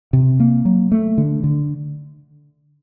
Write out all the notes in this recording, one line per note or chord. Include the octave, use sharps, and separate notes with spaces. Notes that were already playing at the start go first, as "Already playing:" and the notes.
C3
A#3
F#3
A3
D3
D3